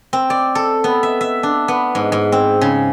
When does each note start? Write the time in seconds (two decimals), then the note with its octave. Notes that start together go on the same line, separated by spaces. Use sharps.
0.13 C4
0.30 D5
0.55 A4
0.84 B3
1.03 E5
1.21 E5
1.43 D4
1.68 B3
1.95 G#2
2.12 G#2
2.32 C4
2.61 C#3